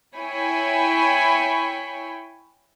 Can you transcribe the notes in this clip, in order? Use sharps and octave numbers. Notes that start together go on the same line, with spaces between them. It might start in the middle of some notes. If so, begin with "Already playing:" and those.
E4 C#5 G5 G#5 B5